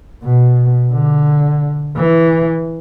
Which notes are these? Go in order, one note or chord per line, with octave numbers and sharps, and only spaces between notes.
B2
D3
E3